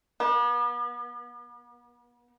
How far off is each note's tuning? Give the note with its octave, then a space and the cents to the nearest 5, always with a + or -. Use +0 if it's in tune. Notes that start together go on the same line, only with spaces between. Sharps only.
B3 -40